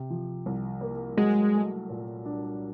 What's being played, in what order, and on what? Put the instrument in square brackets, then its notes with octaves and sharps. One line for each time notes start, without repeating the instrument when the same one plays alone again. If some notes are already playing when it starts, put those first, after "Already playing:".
Already playing: [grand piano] C3
F3
C2
A#3
[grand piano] F#3 [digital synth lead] G#3
[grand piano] A3
A#2
D4